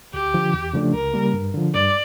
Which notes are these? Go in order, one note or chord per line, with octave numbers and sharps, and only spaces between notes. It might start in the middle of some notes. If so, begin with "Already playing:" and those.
D2 G4
D3 F3
E2
C#3 F3 A3 D4
C#2 A#4
C#3 G3 A#3
G2
D3 F3
G2 D5